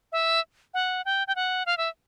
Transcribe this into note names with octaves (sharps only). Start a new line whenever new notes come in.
E5
F#5
G5
G5
F#5
F5
E5